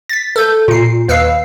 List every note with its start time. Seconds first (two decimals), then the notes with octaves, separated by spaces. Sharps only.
0.09 A6 B6
0.36 A4 G6
0.68 A#2 C7
1.08 D#2 B4 F5 E6 C7